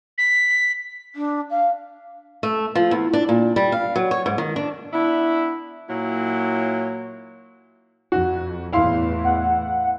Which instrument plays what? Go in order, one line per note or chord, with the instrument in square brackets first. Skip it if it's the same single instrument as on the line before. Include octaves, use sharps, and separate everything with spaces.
[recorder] B6
[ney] D4
F5
[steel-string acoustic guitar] A3
F3
E2
D4
A#2
G3
F5
F#3
C#5
G#2
D#3
D4
[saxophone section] B3 D4 E4
A#2 F#3 A#3 E4 C#5
[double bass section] F2 [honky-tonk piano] F#4
[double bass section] E2 A2 [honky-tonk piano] E4 F5 C6
[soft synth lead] F#5